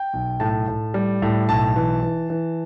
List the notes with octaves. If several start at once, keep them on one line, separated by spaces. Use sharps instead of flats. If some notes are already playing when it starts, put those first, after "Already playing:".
Already playing: G5
B1
A2 A5
A2
G3
A2
B1 A5
E3
E3
E3